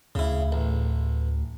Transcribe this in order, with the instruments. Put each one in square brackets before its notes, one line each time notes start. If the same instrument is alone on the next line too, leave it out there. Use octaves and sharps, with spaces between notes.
[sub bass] D2 [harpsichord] C#3 E4
[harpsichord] A1